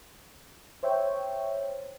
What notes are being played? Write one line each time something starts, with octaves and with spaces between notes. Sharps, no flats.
C5 C#5 E5 G5